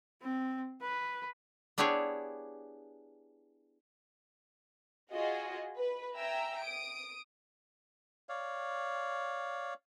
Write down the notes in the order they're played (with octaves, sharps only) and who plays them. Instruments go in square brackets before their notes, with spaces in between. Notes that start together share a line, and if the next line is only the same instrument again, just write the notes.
[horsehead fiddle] C4
B4
[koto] B3 D4 E4 G4 G#4 C#5
[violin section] F4 F#4 G#4 D#5
B4
E5 G5 G#5 A#5 E6
D#6 D7
[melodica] C#5 D5 F5